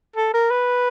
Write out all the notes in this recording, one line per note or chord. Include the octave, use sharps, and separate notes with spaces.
A4
A#4
B4